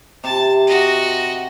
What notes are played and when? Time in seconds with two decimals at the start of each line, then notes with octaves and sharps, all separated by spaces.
0.24 C3 A5
0.67 F#4 D#5